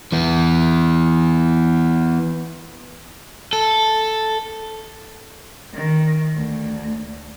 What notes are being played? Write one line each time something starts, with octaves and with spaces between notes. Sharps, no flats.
E3 B3
A4
D#3
D2